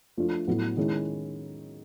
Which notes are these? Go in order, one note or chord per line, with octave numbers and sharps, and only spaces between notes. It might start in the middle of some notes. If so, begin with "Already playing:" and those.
F3 A3 D4 F4
A2 F#3 B3 E4
D#3 G#3 C#4 E4